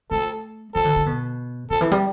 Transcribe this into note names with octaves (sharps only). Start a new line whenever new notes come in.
A3 A4
E3 A4
D3
D3
B2
D3 A4
E3
G3